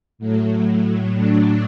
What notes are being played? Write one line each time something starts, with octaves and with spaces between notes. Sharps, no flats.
A2 F#3 A3
D4